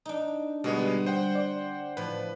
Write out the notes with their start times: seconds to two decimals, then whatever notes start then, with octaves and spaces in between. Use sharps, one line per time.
0.06 D4 D#4
0.64 B2 D3 G3 G#3 B3
1.06 C5 F#5 G5
1.35 D5
1.97 A2 F3 B4